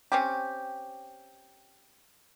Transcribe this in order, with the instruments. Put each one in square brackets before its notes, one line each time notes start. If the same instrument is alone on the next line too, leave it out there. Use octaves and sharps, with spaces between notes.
[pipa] C4 C#4 G4